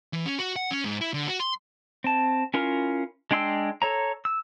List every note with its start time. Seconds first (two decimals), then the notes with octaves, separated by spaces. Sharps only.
0.13 E3
0.26 C#4
0.39 F#4
0.56 F#5
0.71 C#4
0.84 G#2
1.01 E4
1.14 D3
1.28 F#4
1.40 C6
2.04 C4 A5
2.54 C#4 E4 F4 A#4
3.31 G#3 D4 G5 C6 E6
3.82 A4 C#5 A#5
4.25 E6